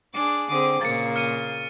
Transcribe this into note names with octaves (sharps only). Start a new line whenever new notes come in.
D4 G#4 D6
D3 C4 G#4 D6
A#2 C#3 A#3 A6 C#7
F6 C#7 D#7